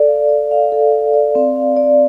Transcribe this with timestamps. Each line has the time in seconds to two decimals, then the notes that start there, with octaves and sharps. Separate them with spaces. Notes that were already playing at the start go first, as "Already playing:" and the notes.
Already playing: A4 D5
0.08 F5
0.29 D5
0.51 F5
0.72 A4
0.92 F5
1.14 D5
1.35 C4
1.55 F5
1.77 D5